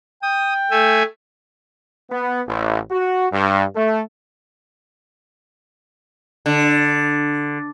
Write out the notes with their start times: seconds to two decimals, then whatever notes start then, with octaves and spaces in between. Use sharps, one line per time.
0.23 G5 D#6
0.71 A3 E5 G#5
2.11 B3
2.47 A1
2.90 F#4
3.32 G2
3.76 A3
6.46 D3